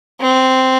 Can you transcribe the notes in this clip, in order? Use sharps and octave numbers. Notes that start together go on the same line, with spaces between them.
C4